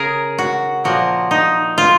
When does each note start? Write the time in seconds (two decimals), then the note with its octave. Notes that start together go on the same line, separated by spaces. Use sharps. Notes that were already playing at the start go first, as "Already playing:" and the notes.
Already playing: C#3 G#4 A#4
0.38 F#4
0.84 A#2 F3 A#3 F#4
1.31 D#4
1.78 F4